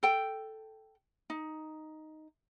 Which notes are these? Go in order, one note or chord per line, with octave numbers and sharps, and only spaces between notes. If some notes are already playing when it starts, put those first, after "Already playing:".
A4 G5
D#4